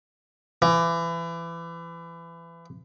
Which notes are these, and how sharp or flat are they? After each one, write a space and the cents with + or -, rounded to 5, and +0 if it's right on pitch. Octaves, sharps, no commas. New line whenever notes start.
E3 +30